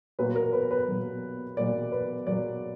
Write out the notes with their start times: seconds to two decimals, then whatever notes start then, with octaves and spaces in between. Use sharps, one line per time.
0.19 B1 A#2 F#3 A#3 B4
0.36 A#4
0.53 B4
0.71 B4
0.88 B1 A#2 F#3 A#3
1.57 B1 A#2 F#3 A#3 D5
1.92 B4
2.27 B1 A#2 F#3 A#3 D5